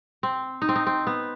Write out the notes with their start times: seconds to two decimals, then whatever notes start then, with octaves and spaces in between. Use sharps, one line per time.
0.23 C4
0.62 D#4
0.69 C4
0.76 D#4
0.87 C4
1.07 B3